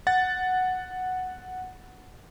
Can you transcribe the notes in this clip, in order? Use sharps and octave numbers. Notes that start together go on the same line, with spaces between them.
F#5 A6